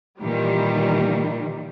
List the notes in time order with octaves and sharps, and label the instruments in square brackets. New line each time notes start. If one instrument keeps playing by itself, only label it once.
[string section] A#2 D#3 E3 G3